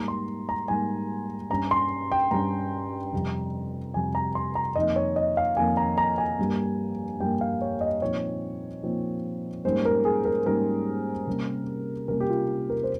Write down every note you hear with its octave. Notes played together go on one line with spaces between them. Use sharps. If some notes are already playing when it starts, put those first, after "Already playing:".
Already playing: G#2 G3 A#3 A#5
C6
A#5
G#2 G3 A#3 G#5
G2 G3 C#4 A#5
C6
G5
G2 G3 C#4 A#5
F2 C3 G3
F2 C3 G3 G#5
A#5
C6
A#5
F2 D#3 A#3 D#5
C#5
D#5
F5
F2 D#3 A#3 G#5
A#5
A#5
G#5
G2 G3 A#3
G2 G3 A#3 G5
F5
C#5
D#5
A#2 F3 C4 D#4 C#5
A#2 F3 C4 D#4
G#2 G3 A#3 C#4 C5
A#4
G#4
A#4
G#2 G3 A#3 C#4 A#4
C3 G3 A#3 C#4
C3 G3 A#3 C#4 A#4
G4
F4
A#4
C5